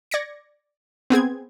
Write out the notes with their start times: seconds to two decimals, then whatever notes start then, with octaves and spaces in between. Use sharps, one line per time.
0.11 D5 G#6 A#6 C#7
1.10 B3 C4 G#4 G#6